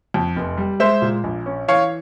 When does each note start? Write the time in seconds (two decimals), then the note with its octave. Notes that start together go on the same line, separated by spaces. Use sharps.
0.14 F2
0.36 F1
0.57 G3
0.80 G#3 C5 E5
1.02 A#2
1.24 A#1
1.46 C#4
1.68 E3 C#5 F5